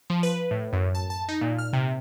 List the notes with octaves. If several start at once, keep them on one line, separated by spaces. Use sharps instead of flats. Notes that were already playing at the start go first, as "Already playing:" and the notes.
F3
B4
A2
F#2
A5
A5
D#4
A#2
F6
C3